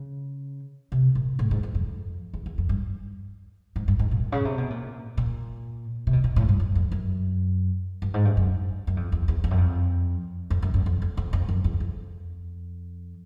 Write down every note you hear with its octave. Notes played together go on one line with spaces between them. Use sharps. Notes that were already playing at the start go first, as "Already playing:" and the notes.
Already playing: C#3
C3
A#2
A2
G#2
F#2
F2
E2
E2
F2
G2
G#2
G2
G#2
A#2
C#3
C3
B2
A#2
A#2
C3
B2
A#2
A2
G2
F#2
F2
F#2
G2
G#2
G2
F#2
F#2
F2
E2
E2
F2
F#2
F2
F2
F#2
F#2
F2
F2
F2
F2
F#2
E2
F2